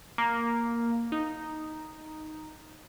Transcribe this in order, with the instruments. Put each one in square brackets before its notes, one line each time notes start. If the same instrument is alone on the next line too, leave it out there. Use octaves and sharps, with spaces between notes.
[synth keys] A#3
D#4